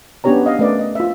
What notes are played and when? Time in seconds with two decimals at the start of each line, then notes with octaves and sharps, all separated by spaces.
0.24 B3 C#4 D4 G4 C#5 A#5
0.46 D#5 F5
0.59 A3 C#4 A#4 B4 D5 D#5
0.79 D#5
0.95 F4 E5